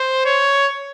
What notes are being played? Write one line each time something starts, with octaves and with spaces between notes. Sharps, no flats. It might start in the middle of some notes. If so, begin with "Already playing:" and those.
Already playing: C5
C#5